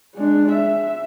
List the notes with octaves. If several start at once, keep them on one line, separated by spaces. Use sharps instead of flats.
G#3 D4
E5